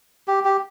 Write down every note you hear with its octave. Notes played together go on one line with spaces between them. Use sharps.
G4
G4